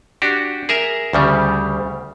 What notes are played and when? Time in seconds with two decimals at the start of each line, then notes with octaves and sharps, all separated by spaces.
0.22 D4 F#4 G4
0.69 G#4 A#4 E5
1.13 D2 C#3 G3